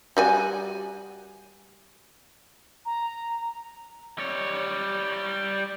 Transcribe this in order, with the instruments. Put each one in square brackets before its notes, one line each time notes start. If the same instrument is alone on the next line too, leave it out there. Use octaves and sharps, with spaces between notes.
[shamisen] G3 F#4 G#5
[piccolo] A#5
[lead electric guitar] G3 C#5